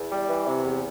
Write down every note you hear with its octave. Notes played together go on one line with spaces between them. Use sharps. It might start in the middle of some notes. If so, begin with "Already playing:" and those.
Already playing: E2
G3
E3
C3
E2